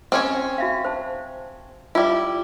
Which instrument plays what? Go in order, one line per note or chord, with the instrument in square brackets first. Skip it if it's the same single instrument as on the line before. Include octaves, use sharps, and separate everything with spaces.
[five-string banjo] C4 C#4 C#5
[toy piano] F#4 E5 F5
C5 A5
[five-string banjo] G3 E4 [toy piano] F4